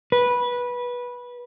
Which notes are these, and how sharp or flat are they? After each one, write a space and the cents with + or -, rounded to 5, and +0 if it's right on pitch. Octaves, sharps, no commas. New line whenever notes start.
B4 -15